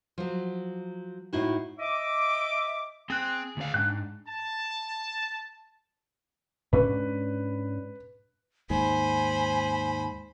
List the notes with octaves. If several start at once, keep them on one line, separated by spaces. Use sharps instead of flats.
F3 F#3
A2 D#4 E4 F#4
D#5 E5 D6
C4 G#4 G5 F#6
D2 F5
G#2 D4 G5 F#6
A5
G#2 C#4 D4 B4
D#2 G#2 C5 G#5 B5